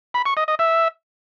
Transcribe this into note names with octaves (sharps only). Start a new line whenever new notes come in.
B5
C#6
D#5
D#5
E5